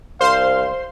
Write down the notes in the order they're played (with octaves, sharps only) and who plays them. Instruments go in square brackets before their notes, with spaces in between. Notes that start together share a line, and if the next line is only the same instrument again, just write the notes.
[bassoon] C2 [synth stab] C5 C6 [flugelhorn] F5